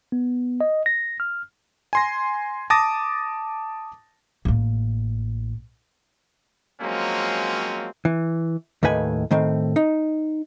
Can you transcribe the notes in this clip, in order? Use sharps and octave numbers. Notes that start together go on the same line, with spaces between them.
B3
D#5
A#6
F6
G#5 C6 A#6
A5 D6 D#6 A6 A#6
A1 A#3
F3 F#3 G#3 A#3 C4 C#4
E3
D#2 A2 D#3 B4 G#5
A2 D#3 C4
D#4